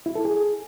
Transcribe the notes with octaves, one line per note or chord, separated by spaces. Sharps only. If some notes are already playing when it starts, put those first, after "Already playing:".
E4
A4
G#4